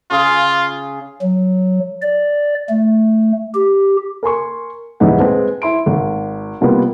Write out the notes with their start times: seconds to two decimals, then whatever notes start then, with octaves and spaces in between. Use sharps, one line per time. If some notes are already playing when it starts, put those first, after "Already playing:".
0.11 C#3 F4 G#4
1.22 F#3
2.02 D5
2.70 A3
3.54 G4
4.23 A#4 G#5 C6 C#6
5.00 D#1 G#2 E3 D#4 B4 F#5
5.19 G#3 C4 B4
5.62 E4 C6 D7
5.86 G#1
6.61 C3 G3 A#3 B3 F4